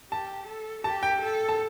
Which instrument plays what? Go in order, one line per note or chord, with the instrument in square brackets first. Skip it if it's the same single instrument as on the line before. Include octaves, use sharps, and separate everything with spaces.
[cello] G4 [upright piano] A5
[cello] A4
[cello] G4 [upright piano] A5
[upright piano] G5
[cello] A4
[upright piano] A5